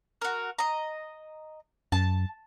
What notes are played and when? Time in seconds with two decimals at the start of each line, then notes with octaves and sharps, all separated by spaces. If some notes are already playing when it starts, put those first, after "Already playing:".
0.21 F#4 A#4
0.59 D#5 A#5
1.92 F#2 A5